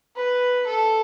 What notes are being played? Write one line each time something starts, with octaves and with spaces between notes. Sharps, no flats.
B4
A4